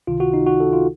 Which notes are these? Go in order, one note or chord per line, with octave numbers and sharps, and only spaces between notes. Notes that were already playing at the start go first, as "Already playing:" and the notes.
C#2 C3 D#3 F4
F#4
D#4
F#4
A4
F4